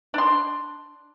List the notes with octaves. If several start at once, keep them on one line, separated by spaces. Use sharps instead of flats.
D4 C6